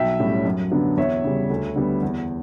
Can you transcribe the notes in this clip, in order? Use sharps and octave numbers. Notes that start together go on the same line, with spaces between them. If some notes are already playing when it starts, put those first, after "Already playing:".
Already playing: B1 E5 G5
A2 G3 C#4
F#2
D3 F#3 B3 D4
E2 C#5 E5
C#3 G3
D2
D3 G3 B3
E2